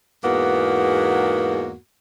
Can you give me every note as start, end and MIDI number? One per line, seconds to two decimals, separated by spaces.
0.23 1.75 40
0.23 1.75 44
0.23 1.75 58
0.23 1.75 59
0.23 1.75 66